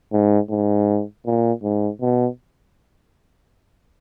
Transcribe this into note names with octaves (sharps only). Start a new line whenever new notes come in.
G#2
G#2
A#2
G#2
B2